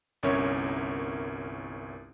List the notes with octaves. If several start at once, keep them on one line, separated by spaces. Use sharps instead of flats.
G1 C2 C#4 A#4 C#5 E5